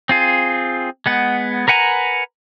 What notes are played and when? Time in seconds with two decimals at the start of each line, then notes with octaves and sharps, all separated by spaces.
0.09 C4 F4 G#4
1.06 G#3 B3 F#5
1.68 A#4 B4 F#5 G#5 A#5